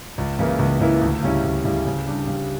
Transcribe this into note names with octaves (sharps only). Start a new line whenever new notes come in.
C#2
C#3 E3 A#3 E4
C#2
C#3 E3 A#3 E4
D2
C#3 G3 C#4 E4
D2
C#3 G3 C#4 E4
C#3
G3 D4 G4
C#3